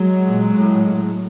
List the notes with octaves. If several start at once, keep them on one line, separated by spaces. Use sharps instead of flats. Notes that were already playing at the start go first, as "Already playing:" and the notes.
Already playing: F#3 G#3
A#2
A2
A2